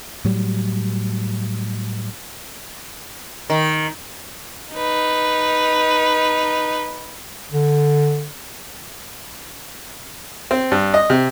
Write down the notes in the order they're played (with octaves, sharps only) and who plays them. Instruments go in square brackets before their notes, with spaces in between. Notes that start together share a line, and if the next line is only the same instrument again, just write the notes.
[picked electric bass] A2 F#3 G3
[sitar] D#3
[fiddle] D#4 B4
[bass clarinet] D3
[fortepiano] C4
G2
D#5
C3